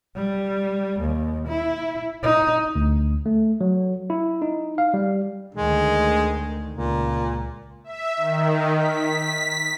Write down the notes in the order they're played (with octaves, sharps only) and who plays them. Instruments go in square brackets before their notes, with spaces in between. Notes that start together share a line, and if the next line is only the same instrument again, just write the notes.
[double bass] G3
D#2
E4
D#4
[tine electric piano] D2
A3
F#3
E4
D#4
F5
G3
[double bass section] D2 D#3 [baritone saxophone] G#3
[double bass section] C#2 [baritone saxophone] A#2
[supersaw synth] E5
D#3
B6